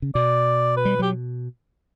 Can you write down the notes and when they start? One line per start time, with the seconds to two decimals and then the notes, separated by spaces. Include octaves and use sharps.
0.02 C#3
0.15 B2 D5
0.77 B4
0.85 G3
0.99 F#3 G4